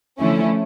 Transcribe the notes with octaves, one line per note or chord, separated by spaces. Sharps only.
D3 F3 A3 C#4 E4